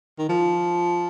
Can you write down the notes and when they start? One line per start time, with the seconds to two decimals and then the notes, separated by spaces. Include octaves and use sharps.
0.18 D#3
0.29 F3